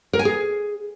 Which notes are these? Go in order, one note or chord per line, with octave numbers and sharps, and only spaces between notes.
A#4
G#5
G#4